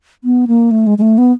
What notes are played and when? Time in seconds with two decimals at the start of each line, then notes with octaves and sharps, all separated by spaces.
0.24 B3
0.47 A#3
0.71 A3
0.87 G#3
0.98 G#3
1.02 A3
1.18 B3